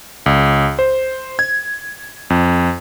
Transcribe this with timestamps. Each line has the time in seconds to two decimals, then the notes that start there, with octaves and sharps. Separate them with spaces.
0.26 C#2
0.79 C5
1.39 G#6
2.30 F2